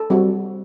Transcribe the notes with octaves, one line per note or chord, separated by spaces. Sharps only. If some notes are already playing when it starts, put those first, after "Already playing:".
Already playing: A4
G3 C4 F#4